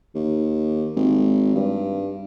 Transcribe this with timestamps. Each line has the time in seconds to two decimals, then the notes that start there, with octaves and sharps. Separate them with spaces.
0.15 D#2
0.96 G#1
1.55 G2